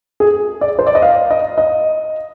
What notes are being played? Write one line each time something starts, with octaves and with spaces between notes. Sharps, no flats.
G#4
D5
C5
D5
D#5
F5
D#5
D#5